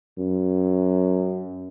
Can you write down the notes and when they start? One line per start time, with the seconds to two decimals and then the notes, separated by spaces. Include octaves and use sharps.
0.18 F#2